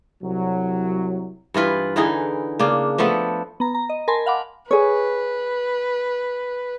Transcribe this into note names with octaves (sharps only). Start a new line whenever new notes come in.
C2 F#3
G2 E3 F4 B4
D3 E3 D#4 G#4
C#3 A#3 D4
F3 A3 B3 A4
B3 A#5
A#5
D#5
A#4 G#5 A5 B5 C6
F5 F#5 B5 D6
G#4 B4 C#5